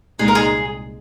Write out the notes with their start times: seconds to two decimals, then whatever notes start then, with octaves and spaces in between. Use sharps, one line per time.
0.18 C2 A#2 G#3 D#4 G#4
0.28 A#4
0.35 G#4